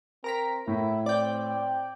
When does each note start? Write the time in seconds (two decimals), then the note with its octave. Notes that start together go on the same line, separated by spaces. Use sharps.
0.24 C4 A#4 A#5 B6
0.67 A2 E4
1.06 C4 D5 G5